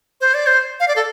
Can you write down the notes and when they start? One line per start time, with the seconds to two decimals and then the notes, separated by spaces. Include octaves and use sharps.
0.21 C5
0.34 D5
0.47 C5
0.80 F5
0.88 D5
0.96 A4